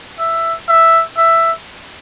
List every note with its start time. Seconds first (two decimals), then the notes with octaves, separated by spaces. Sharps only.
0.19 E5
0.68 E5
1.17 E5